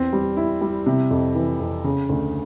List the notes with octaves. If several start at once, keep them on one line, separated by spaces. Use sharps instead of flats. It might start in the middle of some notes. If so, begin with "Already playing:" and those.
Already playing: E2 C4
G3
E4
G3
C3
F2
E3
F2
C#3
D2